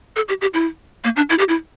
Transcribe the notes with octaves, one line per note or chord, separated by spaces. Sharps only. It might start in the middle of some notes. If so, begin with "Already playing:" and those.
A4
G4
G4
E4
A#3
D4
E4
G4
E4